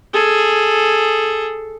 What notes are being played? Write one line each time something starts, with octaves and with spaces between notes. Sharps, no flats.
G#4 A4